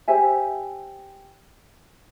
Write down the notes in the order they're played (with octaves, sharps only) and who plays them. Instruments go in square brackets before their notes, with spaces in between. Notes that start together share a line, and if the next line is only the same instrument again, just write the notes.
[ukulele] G4 C5 E5 G#5